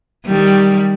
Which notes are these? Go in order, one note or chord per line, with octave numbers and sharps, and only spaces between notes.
D#3 G3